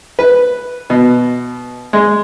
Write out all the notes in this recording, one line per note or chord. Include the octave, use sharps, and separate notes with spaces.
B4
B2
G#3